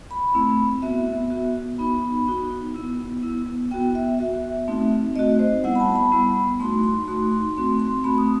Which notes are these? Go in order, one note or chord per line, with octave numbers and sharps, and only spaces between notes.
B5
A3 C4 E4
B3 F#4 E5
B3 F#4
B3 D#4 F#4 B5
B3 D#4 F#4
B3 E4
B3 E4
B3 F#4 G5
E5
B3 F#4 E5
A3 C4 D#4 F#4
A3 C4 D#4 F#4 D#5
C5
G3 B3 E4 F#5
B5
A5
B5
G3 B3 E4
A3 D#4 F#4 C6
C6
A3 D#4 F#4 C6
C6
A3 C4 F#4 C6
C6
A3 C4 F#4 B5
D#6